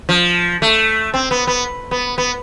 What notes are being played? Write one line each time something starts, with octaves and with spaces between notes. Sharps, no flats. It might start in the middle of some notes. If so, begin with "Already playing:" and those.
F3
A3
C4
B3
B3
B3
B3